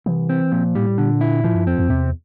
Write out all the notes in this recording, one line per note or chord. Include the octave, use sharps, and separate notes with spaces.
C2 E3
C4
A#2 F3
A2 G3
A#2 D3
E4
A2 F3
G2
F2 C4
F2
E2 C3